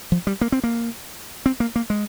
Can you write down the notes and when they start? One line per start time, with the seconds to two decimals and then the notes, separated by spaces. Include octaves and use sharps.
0.12 F3
0.27 G3
0.41 A#3
0.52 C4
0.64 A#3
1.46 C4
1.60 A#3
1.76 A#3
1.90 G#3